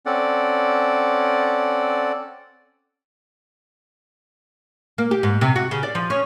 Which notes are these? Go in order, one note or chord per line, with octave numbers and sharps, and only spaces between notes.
C4 C#4 A4 D5 F#5
A#3
G4
G#2
C3
F#4
C#3
D5
F3
C#4